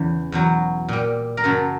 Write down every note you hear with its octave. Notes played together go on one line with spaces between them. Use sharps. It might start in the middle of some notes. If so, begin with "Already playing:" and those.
Already playing: E2 C#3 E3
E2 B2 F#3
A#2 G3
A#4
F#2 C#3 F#3 A4